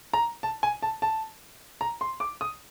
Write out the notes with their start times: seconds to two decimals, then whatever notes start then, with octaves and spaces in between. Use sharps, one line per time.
0.13 A#5
0.43 A5
0.63 G#5
0.82 A5
1.02 A5
1.81 A#5
2.01 C6
2.20 D6
2.41 D#6